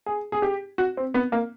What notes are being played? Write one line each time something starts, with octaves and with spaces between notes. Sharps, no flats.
G#4
G#4
G4
F#4
C4
B3
A#3